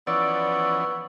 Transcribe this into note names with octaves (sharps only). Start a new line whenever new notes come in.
E3 F3 B3 C#4 D5 C#6 E6